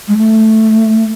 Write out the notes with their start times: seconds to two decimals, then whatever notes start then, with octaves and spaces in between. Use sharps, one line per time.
0.08 G#3
0.18 A3